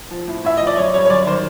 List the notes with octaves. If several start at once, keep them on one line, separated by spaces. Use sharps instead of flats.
F3
A2
A2 E5
F3 D#5
D5
F#2 C#5
G3 C#5
C#5
F#2 D5
D#3 C5